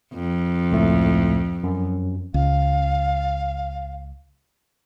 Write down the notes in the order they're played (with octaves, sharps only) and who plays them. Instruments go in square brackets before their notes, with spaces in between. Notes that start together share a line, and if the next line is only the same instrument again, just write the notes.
[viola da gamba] F2
[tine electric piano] C#2 A2 A3
F#2
[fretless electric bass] C#2 [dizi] F5